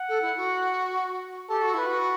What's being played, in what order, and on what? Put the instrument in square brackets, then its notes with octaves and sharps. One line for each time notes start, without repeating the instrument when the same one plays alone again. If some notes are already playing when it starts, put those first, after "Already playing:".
Already playing: [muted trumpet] F#5
[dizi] A4
E4
F#4
[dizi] G4 [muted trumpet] A4
[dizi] F#4
[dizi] E4 [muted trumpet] B4
[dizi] F#4